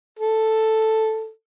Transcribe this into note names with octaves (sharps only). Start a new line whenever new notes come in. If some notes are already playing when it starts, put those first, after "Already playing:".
A4